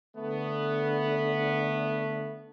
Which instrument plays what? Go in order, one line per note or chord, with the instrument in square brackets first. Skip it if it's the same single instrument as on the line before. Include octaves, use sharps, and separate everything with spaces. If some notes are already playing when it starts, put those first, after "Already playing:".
[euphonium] D3 [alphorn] A3 [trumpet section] B3